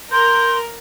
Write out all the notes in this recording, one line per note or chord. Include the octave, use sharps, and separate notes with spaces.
A#4 C6 G6